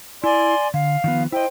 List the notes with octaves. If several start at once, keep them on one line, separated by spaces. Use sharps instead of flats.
E4 D5 G#5 C6
D3 F5
D#3 F3 B3
E4 C5 D#5 G5